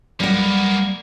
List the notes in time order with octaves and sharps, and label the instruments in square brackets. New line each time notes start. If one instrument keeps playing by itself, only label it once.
[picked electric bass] C#2 F#3 [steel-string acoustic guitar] G3 F#5 [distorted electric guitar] A#3 B3